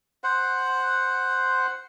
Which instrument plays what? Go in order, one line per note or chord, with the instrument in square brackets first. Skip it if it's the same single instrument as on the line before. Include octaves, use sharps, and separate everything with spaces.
[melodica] C5 F#5